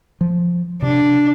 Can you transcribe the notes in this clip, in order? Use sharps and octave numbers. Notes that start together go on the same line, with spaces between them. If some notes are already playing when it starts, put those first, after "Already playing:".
F3
C3 D4